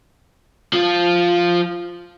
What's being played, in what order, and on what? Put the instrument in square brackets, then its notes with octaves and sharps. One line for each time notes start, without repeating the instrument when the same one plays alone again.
[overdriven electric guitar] F3 F4